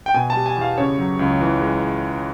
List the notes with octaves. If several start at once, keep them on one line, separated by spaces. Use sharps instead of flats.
G5
B2 G#5
A5
G3
G#5
E2 F5
C#3 C#5
F#3
C#2
E3
G#3